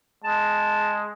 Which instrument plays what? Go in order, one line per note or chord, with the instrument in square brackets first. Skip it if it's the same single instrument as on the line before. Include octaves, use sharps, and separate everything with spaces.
[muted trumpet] G#3 [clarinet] A5